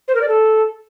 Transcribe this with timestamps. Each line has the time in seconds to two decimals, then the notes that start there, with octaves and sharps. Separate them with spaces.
0.08 C5
0.15 A#4
0.22 D5
0.28 A4